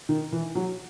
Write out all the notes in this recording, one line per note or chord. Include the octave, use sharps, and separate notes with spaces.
D#3
E3
F#3